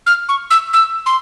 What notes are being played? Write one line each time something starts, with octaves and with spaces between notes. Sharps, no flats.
F6
C#6
E6
E6
C6